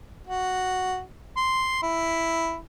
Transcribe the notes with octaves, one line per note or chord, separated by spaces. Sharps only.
F#4
C6
E4